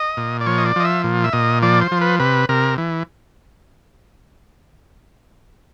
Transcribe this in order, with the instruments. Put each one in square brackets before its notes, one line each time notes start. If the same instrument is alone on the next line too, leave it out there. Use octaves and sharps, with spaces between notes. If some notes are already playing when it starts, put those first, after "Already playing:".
Already playing: [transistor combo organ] D#5
A#2
D5
F3 C#5
D#5
D5
F3 D#5
E5
A#2
E5
A#2 D#5
F3 D5
C5
F3
B4
C3 B4
C3 A#4
E3